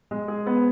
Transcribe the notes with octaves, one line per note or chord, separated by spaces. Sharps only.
G#3
G#4
B3